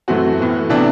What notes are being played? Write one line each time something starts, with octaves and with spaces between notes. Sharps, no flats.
F#2 E3 A3 C4 F#4
A2 E3 B3
C3 E3 B3 D4